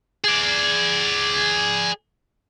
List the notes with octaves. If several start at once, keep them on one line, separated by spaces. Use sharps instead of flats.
G#4 D5